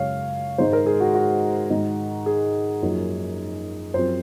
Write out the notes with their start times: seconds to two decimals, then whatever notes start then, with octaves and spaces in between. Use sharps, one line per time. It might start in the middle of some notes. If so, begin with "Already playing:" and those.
Already playing: F#2 C#3 G#3 C#5 F5
0.58 G#2 D#3 G#3 D#4 C5
0.73 A#4
0.86 G#4
1.00 F#4
1.15 F#4
1.70 G#2 D#3 G#3 D#4
2.26 G#4
2.83 F#2 F3 A#3 D#4
3.94 F#2 F3 C4 C5